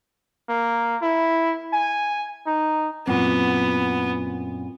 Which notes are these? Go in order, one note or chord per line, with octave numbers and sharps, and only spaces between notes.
A#3
E4
G#5
D#4
F#2 A#2 B3 C4 F4